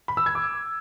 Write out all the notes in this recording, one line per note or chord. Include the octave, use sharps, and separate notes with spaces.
B5
E6
G#6
D6